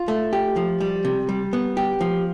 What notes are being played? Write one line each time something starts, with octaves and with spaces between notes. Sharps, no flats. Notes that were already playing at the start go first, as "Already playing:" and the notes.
Already playing: F4
A3
G4
F3
G3
C3
G3
B3
G4
F3